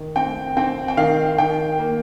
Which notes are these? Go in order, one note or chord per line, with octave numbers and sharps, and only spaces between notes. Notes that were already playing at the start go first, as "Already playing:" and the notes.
Already playing: D#3
C4 G5
C4 G5
G5
D#3 F5
D#3 G5
A#3